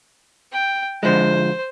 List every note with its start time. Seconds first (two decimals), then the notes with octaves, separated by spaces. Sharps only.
0.52 G5
1.03 D3 F3 G#3 C5